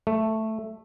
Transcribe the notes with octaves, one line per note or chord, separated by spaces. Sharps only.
A3